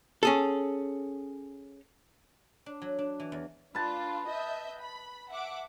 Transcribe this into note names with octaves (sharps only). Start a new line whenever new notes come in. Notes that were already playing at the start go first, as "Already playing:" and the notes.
C#4 G#4 A4
D4
F#3
D4
E3
E2
D4 F4 B4 A5
D#5 E5 G6
B5
E5 F#5 D6